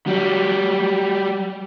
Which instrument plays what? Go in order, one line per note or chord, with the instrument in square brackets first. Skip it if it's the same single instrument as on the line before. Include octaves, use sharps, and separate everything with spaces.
[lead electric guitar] F#3 G3